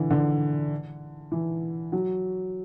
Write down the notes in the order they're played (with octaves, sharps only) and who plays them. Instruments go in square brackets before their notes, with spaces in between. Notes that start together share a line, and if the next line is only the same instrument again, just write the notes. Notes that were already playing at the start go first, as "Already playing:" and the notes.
Already playing: [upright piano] D3 E3
D3
E3
F#3